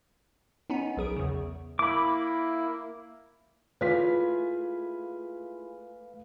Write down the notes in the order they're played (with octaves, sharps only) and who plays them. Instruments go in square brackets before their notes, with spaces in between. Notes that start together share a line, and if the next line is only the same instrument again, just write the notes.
[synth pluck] B3 C#4 D#4
B1 G#4 D7
E2 C#3
[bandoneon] A#3 E4 [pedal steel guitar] B5 D6
[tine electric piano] A3 F5 [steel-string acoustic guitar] E4 F4 G#4 [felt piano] B4 B6